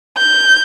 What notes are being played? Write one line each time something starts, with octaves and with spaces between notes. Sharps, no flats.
G6